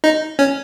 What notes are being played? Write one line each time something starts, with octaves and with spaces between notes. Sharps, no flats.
D#4
C#4